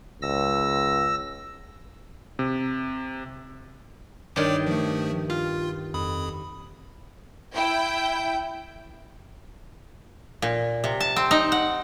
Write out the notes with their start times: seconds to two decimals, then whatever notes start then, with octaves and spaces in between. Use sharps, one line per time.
0.22 C#2 E6 A#6
2.39 C3
4.36 G2 D#3 C#5 D5 D6
4.67 F3 A3
5.30 F4 F5
5.94 F2 B5 D#6
7.55 E4 G5
10.42 A#2
10.84 C3
11.00 A5
11.16 C4
11.31 D#4
11.52 F#5